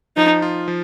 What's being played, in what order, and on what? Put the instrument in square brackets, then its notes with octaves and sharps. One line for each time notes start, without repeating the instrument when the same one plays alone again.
[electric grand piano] F3 [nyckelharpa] D#4
[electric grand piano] F4
F3